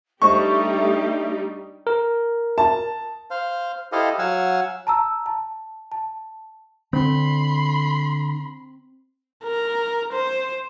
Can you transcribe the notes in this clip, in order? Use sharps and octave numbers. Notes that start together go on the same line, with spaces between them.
G3 A3 D4 D#4 G4 C5 D#5 C#6
A#4
A5
C5 F5
E4 G4 A4 C5 D#5 F5
F#3 F5 F#5 G#5 E6
A5 A#5 E6
A5
A5
D3 C4 B5 C6
A#4
C5